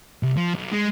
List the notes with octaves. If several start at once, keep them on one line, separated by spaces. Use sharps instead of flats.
C2
F3
B1
G#3